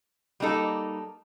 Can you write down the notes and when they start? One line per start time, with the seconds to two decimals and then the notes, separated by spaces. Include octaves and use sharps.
0.40 G3 A#3 D#4 A4